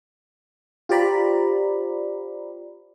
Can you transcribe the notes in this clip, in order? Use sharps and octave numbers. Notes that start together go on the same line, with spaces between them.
F4 G4 C5 D5 A#5 B5